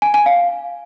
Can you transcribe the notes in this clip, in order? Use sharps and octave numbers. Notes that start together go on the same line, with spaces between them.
G#5
G#5
F5